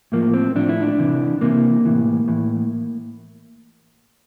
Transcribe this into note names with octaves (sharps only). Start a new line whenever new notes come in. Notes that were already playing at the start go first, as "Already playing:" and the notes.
A2 F3 A#3
C4
A2 F3 D4
E4
D4
C3 E3
C3 E3 A#3
A2 E3
A2 E3